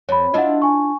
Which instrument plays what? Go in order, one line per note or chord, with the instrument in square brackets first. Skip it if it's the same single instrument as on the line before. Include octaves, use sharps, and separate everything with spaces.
[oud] F2 [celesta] C#5 B5
[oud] D4 E4 F4 [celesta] D#5 F#5
[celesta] G#5 C#6